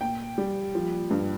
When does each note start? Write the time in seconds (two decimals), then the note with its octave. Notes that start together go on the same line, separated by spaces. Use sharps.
0.01 A#2 G5
0.38 G3
0.75 F3
1.11 G2